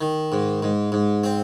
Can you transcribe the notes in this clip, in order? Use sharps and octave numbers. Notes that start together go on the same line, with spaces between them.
D#3
G#2
G#2
G#2
C4